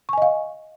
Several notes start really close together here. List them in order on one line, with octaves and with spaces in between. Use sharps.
C#6 G#5 D#5 F5